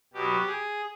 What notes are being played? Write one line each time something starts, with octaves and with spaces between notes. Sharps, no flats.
B2 F#3 B3 G4
G#4